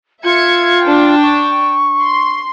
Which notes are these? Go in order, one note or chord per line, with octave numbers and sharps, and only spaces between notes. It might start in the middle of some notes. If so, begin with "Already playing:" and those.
F4 E5 G#6 C#7
D4 G5
C#6
C6